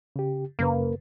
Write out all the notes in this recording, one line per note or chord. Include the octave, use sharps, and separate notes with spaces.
C#3 G4
F#2 C#3 A#3 B4